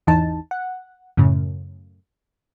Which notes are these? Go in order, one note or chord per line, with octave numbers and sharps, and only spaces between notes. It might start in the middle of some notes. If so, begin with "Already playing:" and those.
G#1 E2 E3 D#4 A5
F#5
F#2 A2 C#3